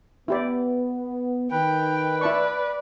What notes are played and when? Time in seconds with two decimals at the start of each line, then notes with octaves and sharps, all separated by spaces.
0.28 B3 E4 G4 D5
1.52 D#3 B4 G5
2.21 E4 D5 A5 C#6